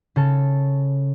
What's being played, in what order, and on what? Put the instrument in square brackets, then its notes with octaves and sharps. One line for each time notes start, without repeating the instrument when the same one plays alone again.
[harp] C#3 A4